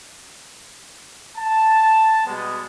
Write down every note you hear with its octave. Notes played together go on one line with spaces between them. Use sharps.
A5
B2 G3 G#3 B3